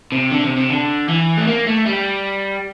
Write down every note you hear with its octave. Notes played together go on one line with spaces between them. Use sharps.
C3
D3
C3
C3
D3
E3
A3
A#3
A3
G3